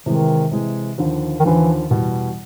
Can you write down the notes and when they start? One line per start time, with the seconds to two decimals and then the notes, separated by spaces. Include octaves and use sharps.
0.06 C3 D#3 E3 G#3
0.52 C3 E3 G#3
0.98 D#2 D3 F3
1.40 D#3
1.45 D#2 D3 E3 F3
1.90 E2 B2 G3